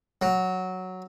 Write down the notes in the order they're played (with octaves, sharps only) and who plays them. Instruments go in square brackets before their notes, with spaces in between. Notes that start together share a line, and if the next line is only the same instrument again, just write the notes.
[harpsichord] F#3